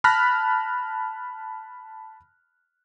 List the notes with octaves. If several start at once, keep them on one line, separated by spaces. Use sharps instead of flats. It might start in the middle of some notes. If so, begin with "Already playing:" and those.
A5 B5 F6 F#6 A#6 B6